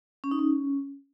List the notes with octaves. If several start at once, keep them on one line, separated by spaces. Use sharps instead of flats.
C#4
D#4
C#4